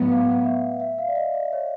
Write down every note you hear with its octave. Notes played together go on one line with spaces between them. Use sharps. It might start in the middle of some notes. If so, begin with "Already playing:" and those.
Already playing: A2 F#3 B3 B4
F5
F#5
E5
E5
F5
D5
D#5
D5
C#5